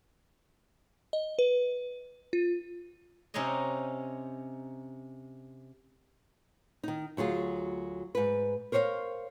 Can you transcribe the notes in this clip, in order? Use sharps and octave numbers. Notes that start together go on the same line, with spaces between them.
D#5
B4
F4
C3 C#4 D#4 C5 C#5 D#5
D#3 D#4
D2 F#3 F4 G#4
G#2 B4
A#4 C5 C#5 D#5 F5